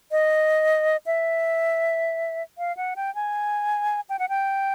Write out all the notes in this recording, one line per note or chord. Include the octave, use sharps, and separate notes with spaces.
D#5
E5
F5
F#5
G5
G#5
G5
F#5
G5